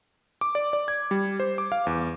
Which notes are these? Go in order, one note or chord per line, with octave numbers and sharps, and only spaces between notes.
D6
D5
D5
G#6
G3
C5
D6
F5
E2